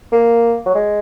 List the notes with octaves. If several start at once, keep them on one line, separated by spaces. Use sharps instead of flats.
A#3
F#3
G#3